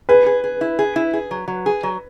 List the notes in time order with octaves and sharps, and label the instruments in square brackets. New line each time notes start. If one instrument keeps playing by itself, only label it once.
[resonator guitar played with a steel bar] G#4 [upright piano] B4
[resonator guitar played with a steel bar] G#4
G#4
E4
G#4
E4
G#4
F#3
F#3
G#4
F#3